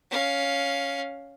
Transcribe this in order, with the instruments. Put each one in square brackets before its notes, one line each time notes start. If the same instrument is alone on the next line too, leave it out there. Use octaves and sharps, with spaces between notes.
[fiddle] C#4 F5